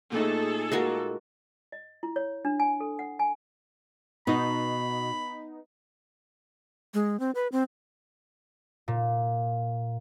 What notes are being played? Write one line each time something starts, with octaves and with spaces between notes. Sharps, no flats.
A#2 A3 D#4 G#4 A4
G#3 A#3 F#4
D#5
E4
C#5
D4
G#5
A4
F#5
G#5
B2 B3 D#4 B5
G#3
C4
B4
C4
A#2